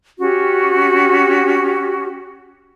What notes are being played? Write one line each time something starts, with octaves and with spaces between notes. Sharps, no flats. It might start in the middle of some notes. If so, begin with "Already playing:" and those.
C#4 F#4 G4